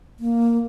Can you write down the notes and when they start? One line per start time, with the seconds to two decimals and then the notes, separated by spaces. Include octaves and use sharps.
0.20 A#3